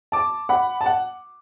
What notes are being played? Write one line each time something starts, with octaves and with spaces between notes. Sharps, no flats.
A5 D6
F#5 B5
A5
F#5